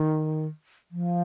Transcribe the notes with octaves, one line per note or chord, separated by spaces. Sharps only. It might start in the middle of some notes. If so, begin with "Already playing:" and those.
Already playing: D#3
F3